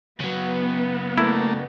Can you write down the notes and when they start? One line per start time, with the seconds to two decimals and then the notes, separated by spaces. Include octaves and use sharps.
0.20 C#3 F#3 B3
1.18 A3 A#3 E4